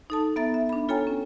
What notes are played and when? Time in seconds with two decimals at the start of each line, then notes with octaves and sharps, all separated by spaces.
0.10 D#4 A4 A5
0.36 B3 E5 A#5 A6
0.54 E5
0.69 D4 B5
0.89 F4 A4 C#5 G5 G#5 A#5
1.07 C#4